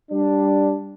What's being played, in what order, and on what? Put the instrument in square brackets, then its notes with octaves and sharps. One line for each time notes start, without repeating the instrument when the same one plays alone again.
[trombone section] G3 D4